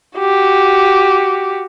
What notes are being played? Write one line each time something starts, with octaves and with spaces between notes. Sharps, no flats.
F#4 G4